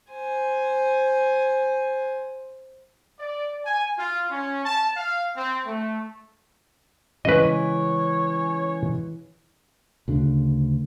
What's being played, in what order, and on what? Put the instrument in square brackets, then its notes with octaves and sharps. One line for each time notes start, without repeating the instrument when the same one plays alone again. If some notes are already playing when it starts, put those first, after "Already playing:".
[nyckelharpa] C5 G#5
[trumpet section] D5
G#5
F4
C#4
A5
F5
C4
A3
[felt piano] C#3 G#3 C#4 [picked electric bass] E3 [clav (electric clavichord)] B4 D#5 [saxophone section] C#5
[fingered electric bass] D2 C#3 D4